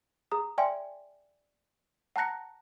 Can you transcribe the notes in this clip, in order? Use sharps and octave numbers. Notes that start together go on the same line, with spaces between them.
G#4 A#5 D#6
D5 E5 G5 G#5 C6
F#5 A5 A#5 F#6 A#6 C#7